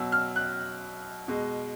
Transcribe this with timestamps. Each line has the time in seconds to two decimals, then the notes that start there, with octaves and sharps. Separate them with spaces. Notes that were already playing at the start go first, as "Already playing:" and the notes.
Already playing: B2 F#3 E6
0.12 F6
0.36 F#6
1.28 B2 G#3